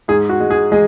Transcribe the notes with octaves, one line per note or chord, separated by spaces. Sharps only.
G#2 G#4
F#4
G#3
G#4
G#3 G#4